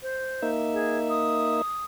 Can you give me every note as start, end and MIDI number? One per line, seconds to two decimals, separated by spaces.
0.02 0.49 72
0.42 1.62 58
0.42 1.62 63
0.42 1.62 76
0.74 0.98 68
1.09 1.85 87